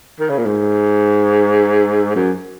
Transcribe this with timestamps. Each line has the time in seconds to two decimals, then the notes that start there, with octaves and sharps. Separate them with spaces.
0.20 D#3
0.29 C#3
0.38 A#2
0.46 G#2
2.16 F#2